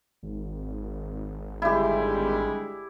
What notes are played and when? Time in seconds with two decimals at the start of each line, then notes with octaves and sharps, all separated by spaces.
0.23 G#1
1.62 D3 G3 G#3 E4 G4